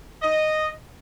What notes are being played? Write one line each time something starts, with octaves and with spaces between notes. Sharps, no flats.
D#5